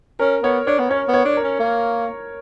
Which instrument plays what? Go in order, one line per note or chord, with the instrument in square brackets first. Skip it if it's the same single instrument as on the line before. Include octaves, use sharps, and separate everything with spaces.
[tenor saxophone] C#4 [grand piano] A#4
[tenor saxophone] B3 [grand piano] C#5
[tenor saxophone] D4 [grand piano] C#5
[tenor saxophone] B3
[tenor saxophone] C#4 [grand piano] C#5
[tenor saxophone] B3
[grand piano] C#5
[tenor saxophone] D4
[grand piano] A#4
[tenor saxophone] C#4
A#3